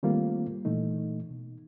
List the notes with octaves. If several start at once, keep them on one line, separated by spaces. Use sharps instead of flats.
D#3 G3 A3 A#3 C4 F4
A#2 E3 A3 D#4
B2